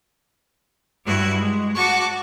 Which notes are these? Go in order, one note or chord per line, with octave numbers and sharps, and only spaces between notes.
G2 E4 F#4
G#3
F#4 F#5 A5 C#6 D6